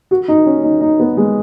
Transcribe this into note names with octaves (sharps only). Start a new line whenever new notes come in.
F#4
D#4
C#4
D#4
D#4
B3
G#3